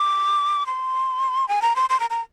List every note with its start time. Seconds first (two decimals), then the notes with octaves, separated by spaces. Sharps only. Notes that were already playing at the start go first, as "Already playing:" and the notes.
Already playing: D6
0.66 C6
1.48 G#5
1.62 A#5
1.76 C6
1.90 C6
2.00 A#5
2.10 A#5